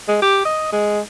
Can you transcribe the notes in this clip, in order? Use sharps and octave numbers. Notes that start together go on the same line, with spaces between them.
G#3
G4
D#5
G#3